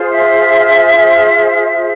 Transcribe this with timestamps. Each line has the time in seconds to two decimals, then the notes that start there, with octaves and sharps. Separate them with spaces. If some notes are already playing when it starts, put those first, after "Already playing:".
Already playing: F4 G#4 C5
0.11 E5